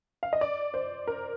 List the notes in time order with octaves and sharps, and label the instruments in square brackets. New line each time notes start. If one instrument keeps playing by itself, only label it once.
[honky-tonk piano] F5
D#5
D5
C5
A#4